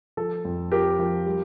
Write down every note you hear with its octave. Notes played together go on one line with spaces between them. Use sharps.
F3 A4
F2
F3 G4 A#4
F3
G3